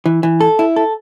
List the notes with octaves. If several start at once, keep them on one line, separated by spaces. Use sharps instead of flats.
E3
E3
A4
E4
A4